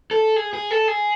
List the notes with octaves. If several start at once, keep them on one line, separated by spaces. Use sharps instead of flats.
A4
G#4
G#4
A4
G#4